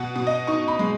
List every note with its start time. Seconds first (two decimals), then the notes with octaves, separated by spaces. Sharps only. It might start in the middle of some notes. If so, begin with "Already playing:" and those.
Already playing: B2 F#5
0.16 B2
0.27 D#5
0.47 D#4 C#6
0.68 B5
0.79 G#3